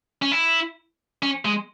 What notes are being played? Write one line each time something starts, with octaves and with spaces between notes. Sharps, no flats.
C#4
E4
C#4
G#3